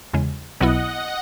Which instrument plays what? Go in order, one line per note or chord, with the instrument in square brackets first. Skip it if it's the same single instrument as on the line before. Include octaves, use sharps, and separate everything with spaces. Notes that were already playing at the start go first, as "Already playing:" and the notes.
[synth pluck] E2 C#3 G#3
[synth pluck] B1 B2 F#3 B3 E4 [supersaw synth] D#5 F#5